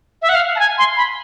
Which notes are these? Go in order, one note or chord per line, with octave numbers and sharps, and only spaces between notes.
E5
F#5
F5
A5
G#5
C6
B5